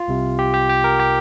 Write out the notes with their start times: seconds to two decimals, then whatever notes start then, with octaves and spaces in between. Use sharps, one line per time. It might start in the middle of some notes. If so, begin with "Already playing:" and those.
Already playing: F4
0.08 C2 C3
0.39 G4
0.54 G4
0.69 G4
0.84 A#4
1.00 G4